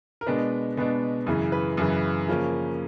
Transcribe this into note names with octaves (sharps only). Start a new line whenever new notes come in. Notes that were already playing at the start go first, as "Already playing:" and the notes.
A#4
B2 G#3 B3 D4 B4
B2 G#3 B3 D4
F#2 C#3 E3
B4
F#2 C#3 E3
C#3 F3 A#3 C#4